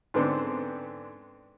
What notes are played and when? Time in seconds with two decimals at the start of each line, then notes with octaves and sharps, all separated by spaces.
0.14 G#2 D3 B3 C4 D4